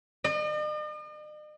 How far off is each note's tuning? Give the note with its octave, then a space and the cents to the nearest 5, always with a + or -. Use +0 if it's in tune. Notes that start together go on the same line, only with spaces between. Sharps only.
D#5 -45